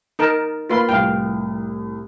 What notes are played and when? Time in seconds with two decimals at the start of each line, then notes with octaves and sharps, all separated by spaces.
0.19 D#4 A#4 A5
0.69 A#3 F4 B4 F5 B5 C6
0.89 C2 A2 F5 G5